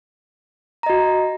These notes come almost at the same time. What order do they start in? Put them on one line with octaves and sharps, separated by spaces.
A#5 D#5 F#4